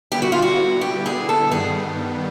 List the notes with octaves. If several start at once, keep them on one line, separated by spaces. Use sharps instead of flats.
D3 G3 B3 E4 G4
F#4
F4
F#4
G4
G#4
A4
G2 D#3 G3 B3 G#4